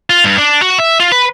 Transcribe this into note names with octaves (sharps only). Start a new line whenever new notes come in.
F4
G2
D4
F#4
E5
F4
B4